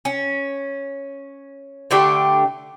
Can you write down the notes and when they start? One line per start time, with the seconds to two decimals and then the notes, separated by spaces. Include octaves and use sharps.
0.05 C#4
1.91 D3 A3 D4 G4